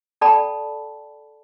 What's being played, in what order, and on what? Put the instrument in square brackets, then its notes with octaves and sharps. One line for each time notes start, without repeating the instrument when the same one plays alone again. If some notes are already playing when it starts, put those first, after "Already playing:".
[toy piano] A4 D5 G5 A5 B5